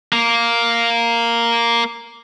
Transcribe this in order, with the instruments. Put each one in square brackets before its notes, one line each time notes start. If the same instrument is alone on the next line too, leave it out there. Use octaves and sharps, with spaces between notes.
[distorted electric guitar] A#3